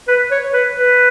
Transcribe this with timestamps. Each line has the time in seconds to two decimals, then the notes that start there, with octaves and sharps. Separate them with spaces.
0.08 B4
0.32 C#5
0.54 B4
0.77 B4